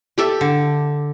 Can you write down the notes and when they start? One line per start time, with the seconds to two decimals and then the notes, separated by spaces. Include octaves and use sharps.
0.18 G4 A4 E5
0.41 D3